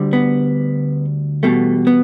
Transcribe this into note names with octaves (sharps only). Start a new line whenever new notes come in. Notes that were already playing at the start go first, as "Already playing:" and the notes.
Already playing: D2 D3 G3
B3
E2 B2 G3 A3
B3